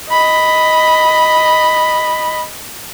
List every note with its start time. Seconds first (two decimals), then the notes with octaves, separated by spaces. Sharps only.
0.11 D#5 B5